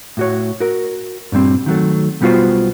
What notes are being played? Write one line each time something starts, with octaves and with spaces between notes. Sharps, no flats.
A2 F#4 C#5
F#4 A#4
G2 A#2 G3 C4
D#3 F#3 A3
B1 G3 B3 F4 F#4 C5